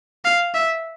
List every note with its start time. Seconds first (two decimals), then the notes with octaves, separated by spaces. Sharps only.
0.25 F5
0.54 E5